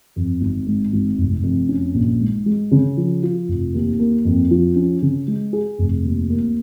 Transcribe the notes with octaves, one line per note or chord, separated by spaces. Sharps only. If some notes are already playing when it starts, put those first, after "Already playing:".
F2
G#1
G#2
G#1
F1
F2
C#4
A#1
G#2
G#3
C#3
F3
F4
F1
D#2
A#3
F2
F3
C#4
C#3
G#3
G#4
F1
D#2
A#3